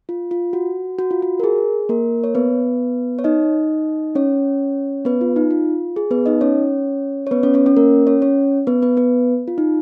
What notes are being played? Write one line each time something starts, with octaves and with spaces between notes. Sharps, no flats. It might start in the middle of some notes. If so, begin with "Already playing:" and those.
F4
F4
F#4
F#4
F4
F#4
A#4
G#4
A#3 A#4
C#5
B3 B4
C#5
D#4 D#5
C#4 C#5
B3 B4
F4
D#4
F4
G#4
B3 B4
D#4 D#5
C#4 C#5
C#5
B3 B4
C#4 C#5
C#4 C#5
C#4 C#5
A#3 A#4
C#4 C#5
C#4 C#5
B3 B4
B3 B4
B3 B4
F4
D#4